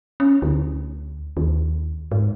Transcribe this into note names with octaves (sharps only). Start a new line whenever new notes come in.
C#4
D2
D#2
G#2